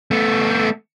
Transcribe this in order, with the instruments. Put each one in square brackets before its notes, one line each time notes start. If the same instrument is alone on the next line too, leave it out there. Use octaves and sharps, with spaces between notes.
[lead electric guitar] A3 B3